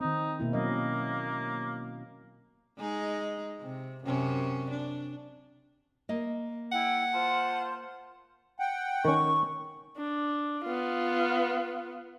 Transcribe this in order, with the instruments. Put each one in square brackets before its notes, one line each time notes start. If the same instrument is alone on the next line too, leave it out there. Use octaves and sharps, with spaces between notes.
[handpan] D#3 C4 [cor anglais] D#4
[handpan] B2 A#3 E4
[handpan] F#3 C#4 D#5 [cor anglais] A#3
[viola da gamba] G#3 D#4 G#4
C3
F#2 C3 C#4
D4
[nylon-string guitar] A#3 D#5
[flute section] E4 G5 [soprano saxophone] F#5
[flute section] F4 C5 A5
[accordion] F#5 G5
[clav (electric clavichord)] D#3 C#4 [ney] C#6
[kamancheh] D4
B3 F4